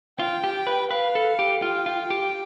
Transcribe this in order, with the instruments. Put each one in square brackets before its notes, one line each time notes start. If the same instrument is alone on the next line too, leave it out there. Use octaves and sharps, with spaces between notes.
[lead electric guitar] F4 [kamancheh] G5
[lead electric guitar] G4
B4
[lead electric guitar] B4 [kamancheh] F5
[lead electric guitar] A4
G4
[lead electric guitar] F4 [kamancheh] G5
[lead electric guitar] F4
G4